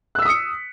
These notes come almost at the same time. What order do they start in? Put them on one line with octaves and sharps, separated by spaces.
F#6 E6 B6 D#6 C#7